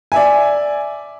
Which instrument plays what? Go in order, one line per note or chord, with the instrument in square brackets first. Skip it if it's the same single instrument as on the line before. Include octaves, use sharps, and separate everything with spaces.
[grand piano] D5 E5 G#5